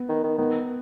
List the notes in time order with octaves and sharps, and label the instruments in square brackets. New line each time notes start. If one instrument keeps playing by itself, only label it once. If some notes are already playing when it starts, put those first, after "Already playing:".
Already playing: [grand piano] B3
[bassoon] D#3
D#3
[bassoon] D#3 [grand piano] B3